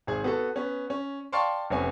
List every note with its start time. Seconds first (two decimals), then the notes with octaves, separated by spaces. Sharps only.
0.07 G#1 G#4 G#6
0.24 B3 F#4 A4
0.56 B3 C#4
0.90 C#4
1.32 D5 F5 G5 A5 C6 C#6
1.70 F1 B3 C#4 G#5